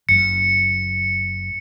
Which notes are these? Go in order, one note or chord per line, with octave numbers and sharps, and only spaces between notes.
F#1 F#2 C#7